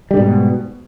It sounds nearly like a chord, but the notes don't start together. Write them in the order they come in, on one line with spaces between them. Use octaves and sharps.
G3 D3 G#2 B2